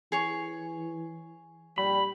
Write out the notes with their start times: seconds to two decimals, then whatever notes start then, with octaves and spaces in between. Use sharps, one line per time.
0.12 E3 G#4 C#5
1.78 A#1 G3 B5